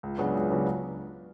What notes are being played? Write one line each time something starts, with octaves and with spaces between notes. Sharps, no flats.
C#2
C#3 F#3 B3 D4
C#2
C#3 F#3 B3 D4